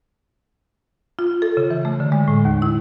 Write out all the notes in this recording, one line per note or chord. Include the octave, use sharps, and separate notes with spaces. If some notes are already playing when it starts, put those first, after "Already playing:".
F4
A4
C#3
E3
A3
D3
G#3
A2
D#2
E4